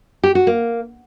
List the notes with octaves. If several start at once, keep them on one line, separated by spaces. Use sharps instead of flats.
G4
F#4
A#3